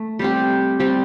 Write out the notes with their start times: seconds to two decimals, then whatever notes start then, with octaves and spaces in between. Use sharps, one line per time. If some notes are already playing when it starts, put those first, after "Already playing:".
Already playing: A3
0.19 G3 C4 G4
0.80 G3 C4 G4